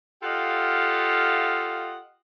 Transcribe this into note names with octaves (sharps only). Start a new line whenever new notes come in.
F4 G4 A4 D#5 F5 F#5